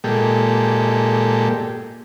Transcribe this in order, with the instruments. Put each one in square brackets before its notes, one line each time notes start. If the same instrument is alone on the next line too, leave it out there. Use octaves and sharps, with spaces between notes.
[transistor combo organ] A#2 G#3 G4 A4